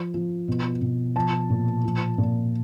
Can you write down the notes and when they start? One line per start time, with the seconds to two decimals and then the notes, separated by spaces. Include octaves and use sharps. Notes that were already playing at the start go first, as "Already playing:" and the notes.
Already playing: F3
0.14 F3
0.48 B2
0.81 B2
1.16 F3 A5
1.50 A#2
1.84 F3
2.18 A#2